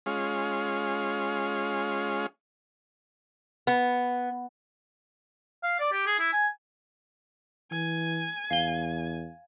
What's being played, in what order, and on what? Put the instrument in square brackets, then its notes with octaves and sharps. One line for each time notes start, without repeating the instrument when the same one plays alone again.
[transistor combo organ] G#3 C#4 F4
[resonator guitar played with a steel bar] B3
[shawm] F5
D5
G4
G#4
E4
G#5
[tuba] E3 [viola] G#5
[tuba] E2 [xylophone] F5 G7